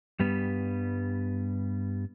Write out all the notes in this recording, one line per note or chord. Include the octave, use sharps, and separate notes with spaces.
G2 G3 B3